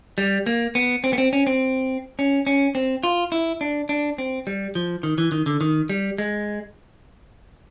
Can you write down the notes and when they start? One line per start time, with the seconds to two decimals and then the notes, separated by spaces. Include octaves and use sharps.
0.18 G3
0.46 A#3
0.75 B3
1.04 C4
1.13 B3
1.18 C4
1.33 C#4
1.47 C4
2.19 C#4
2.47 C#4
2.75 C4
3.03 F4
3.32 E4
3.61 D4
3.89 D4
4.18 C4
4.47 G3
4.75 F3
5.03 D#3
5.18 E3
5.32 D#3
5.46 D3
5.61 D#3
5.89 G3
6.18 G#3